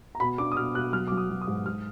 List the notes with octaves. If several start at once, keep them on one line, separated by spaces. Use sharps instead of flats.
A#5
B2 B5
D4 D6
D#6
B2 F6
B2 F#6
F#3 F6
F#3 D6
D#6
F#3
D#6
G#2
G#2 F6